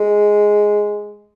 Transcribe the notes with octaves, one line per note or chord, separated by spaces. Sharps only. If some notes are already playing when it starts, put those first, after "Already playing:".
Already playing: G#3